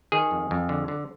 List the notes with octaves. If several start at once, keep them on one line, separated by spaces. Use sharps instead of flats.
D#3 G#4
F2
F2
D3
D3